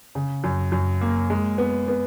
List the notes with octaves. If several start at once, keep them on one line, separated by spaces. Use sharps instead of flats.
C#3
F#2
F#2
A#3
G#3
B3
B3